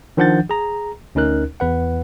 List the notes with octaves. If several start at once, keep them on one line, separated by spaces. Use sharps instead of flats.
D#3 F3 D4 F#5 G6 A6
G#4 A#5
D2 C#4 D#4 A#4 F#6
E2 B4 F#5